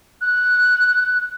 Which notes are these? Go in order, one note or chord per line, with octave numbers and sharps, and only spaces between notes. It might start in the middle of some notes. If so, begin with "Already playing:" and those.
F#6